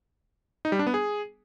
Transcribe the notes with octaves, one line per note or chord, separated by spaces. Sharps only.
D#4
G3
D4
B3
G#4